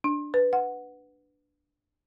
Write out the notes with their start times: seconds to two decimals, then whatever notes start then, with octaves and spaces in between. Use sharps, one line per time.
0.04 D4
0.34 B4
0.53 F#5